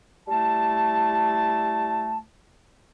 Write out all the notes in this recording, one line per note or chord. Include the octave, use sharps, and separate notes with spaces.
G3 A3 E4 A5